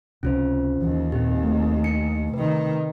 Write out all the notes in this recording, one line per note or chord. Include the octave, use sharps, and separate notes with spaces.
C#2 C3 C#4 F4 C5
D#2 E3
A#2 C4 G4
A3
D4 C#7
C3 D#3 B4